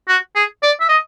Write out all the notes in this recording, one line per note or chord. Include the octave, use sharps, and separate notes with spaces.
F#4
G#4
D5
E5
D#5